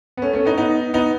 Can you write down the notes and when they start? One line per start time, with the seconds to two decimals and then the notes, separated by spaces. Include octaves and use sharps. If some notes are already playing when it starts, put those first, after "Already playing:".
0.17 B3
0.22 A3 C#4
0.33 A3 C#4
0.45 B3 D#4
0.58 B3 D#4
0.94 B3 D#4